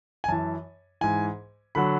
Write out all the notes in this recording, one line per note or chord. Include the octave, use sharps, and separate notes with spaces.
G#5
F#2 E3 A5
G#2 E3 G#5
D3 F#3 B5